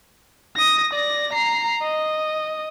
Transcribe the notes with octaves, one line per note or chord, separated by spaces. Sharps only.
D#6 A#6
D5 A#6
A#5 C7
D#5